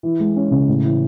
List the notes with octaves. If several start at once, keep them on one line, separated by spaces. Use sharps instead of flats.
E3
G#3
C#4
C#3
A2
E3